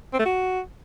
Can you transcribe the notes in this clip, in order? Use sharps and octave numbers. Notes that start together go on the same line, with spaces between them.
C4
A3
F#4